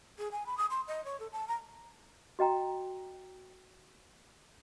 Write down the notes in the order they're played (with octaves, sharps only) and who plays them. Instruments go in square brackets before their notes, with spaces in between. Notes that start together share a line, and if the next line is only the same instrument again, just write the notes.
[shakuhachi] G#4
G#5
B5
D#6
C6
D#5
C#5
A4
A5
A#5
[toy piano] F#4 D#5 G5 A#5